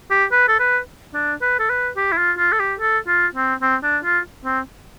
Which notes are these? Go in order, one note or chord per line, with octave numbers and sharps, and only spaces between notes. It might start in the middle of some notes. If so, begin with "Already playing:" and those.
G4
B4
A4
B4
D4
B4
A4
B4
G4
E4
F4
F4
A4
G4
A4
F4
C4
C4
D4
F4
C4